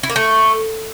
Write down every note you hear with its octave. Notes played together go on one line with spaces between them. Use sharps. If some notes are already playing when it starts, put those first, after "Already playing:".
E4
A#3
A3